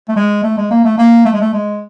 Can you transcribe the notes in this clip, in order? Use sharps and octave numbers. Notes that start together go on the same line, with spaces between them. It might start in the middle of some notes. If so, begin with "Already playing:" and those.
A3
G#3
A3
G#3
A#3
A3
A#3
A3
G#3
A3
G#3